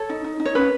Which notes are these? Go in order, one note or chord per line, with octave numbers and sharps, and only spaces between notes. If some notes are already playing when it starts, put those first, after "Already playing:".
Already playing: A4 C#5
D#4
D#4
D#4
C#5
C#4 B4